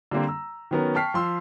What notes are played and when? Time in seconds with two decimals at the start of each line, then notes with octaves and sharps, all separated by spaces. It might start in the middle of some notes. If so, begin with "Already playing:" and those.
0.11 D3 G3 A#3 C4
0.27 A#5 E6
0.71 D#3 F#3 B3 C#4 A#4
0.95 G5 A5 C#6 F6 B6 C7
1.14 F3 C6 E6